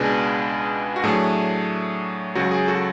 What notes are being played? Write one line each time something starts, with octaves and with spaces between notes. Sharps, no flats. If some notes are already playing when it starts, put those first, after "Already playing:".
Already playing: C#2 B2 G#3 D4 G#4 B4
F#4
A2 F#3 A3 D4 G#4
C#2 C#3 F#3 F#4
G#4
F#4 A4